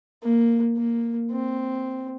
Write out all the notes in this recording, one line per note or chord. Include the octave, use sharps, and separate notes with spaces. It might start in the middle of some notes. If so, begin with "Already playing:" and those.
A#3
A#3
C4